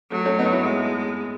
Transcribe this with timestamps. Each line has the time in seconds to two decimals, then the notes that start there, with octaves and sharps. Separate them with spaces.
0.12 F#3 A3
0.25 A3 C#4
0.39 B3 D#4
0.52 C#4 E4
0.65 G#3